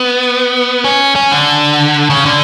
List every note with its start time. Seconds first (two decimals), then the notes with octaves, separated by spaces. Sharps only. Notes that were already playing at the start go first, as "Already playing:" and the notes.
Already playing: B3
0.84 C#4
1.16 C#4
1.32 D3
2.10 C#3
2.26 D3